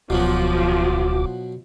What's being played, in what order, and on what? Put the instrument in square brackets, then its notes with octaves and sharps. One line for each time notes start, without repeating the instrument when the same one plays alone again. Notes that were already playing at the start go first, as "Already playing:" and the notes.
[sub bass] D1 [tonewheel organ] D2 F#4 D6 [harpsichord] B2 F#3 B3 [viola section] F3